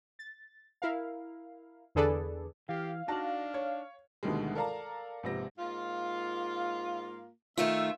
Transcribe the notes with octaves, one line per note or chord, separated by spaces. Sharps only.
A6
E4 A#4 F5
E2 D3 G#4 A4 B4 D5
E3 G4 F5
D4 D#4 F#4 D5 A5
C#5
D2 B2 D3 D#3 G3 G#3
A4 A#4 D5 F5 A5 A#5
A#1 G#2 C3 B4 A#6
G#2 A#3 F4
D#3 A3 F4 E5